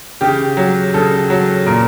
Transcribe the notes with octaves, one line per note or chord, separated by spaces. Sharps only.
C#3 G4
F#3
C#3 A4
F#3
A#2 A#4